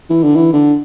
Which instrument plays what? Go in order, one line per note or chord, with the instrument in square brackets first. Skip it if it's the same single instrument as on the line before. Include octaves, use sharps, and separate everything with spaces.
[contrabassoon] E3
D3
E3
D3